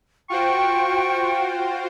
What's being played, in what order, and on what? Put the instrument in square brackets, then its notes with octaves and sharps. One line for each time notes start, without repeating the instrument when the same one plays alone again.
[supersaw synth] F4 F#4 C5 [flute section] G5 [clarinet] C#6